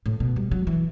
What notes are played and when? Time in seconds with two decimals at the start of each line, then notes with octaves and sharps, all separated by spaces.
0.06 A2
0.20 B2
0.36 G3
0.51 F#3
0.67 E3